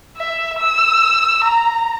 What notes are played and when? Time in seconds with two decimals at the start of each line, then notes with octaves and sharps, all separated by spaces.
0.17 E5
0.58 E6
1.44 A#5